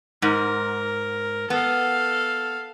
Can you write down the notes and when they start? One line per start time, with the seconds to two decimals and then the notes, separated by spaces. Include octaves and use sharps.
0.22 G#2 A#4
1.50 B3 A4 F5